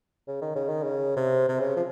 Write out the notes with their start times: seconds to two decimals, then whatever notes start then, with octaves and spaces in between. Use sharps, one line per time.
0.28 C#3
0.42 D#3
0.56 C#3
0.69 D#3
0.83 C#3
1.16 C3
1.49 C3
1.60 C#3
1.76 F3